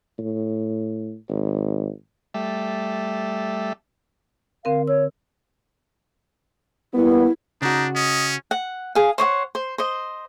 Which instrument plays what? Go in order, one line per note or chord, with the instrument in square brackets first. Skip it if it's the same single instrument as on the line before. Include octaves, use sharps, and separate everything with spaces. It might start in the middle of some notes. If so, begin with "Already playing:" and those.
[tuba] A2
G#1
[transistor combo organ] G3 A3 E5
[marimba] D3 C4 A#4 [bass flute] F5
[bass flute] C#5 [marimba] E6
[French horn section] G3 A#3 B3 [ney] E4
[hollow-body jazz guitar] C#3 F#4 [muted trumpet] D4 [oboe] D#4
[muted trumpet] C#4 [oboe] D#5
[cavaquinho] F#5
G#4 F5
C5 C#5 D#5 F#5
C5
C5 D#5